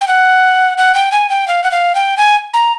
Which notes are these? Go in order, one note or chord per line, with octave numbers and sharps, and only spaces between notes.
G5
F#5
F#5
G5
G#5
G5
F5
F#5
F5
G5
G#5
A#5